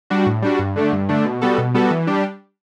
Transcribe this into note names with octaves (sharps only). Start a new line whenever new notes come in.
G3 D4 F#4
A2
G3 D4 F#4
G2
D3 A3 D4
G2
D3 A3 D4
B2
G3 B3 F#4 A4
B2
G3 B3 F#4 A4
E3
G3 D4 G4